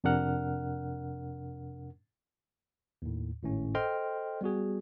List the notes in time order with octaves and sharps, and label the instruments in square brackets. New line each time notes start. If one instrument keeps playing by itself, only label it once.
[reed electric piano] F2 C3 D4 A#4 F#5 F6
[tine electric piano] D#2 A2
G#1 A2 C#4
A4 C5 D#5 G5 C6 F6
G3 B3 F#4 G#4